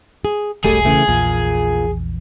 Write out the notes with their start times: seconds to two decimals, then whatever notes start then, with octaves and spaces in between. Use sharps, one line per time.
0.25 G#4
0.64 E1 B1 G3 A3 G#4 A4
0.85 C#3 E3 A3
1.08 A#1 E2 A#2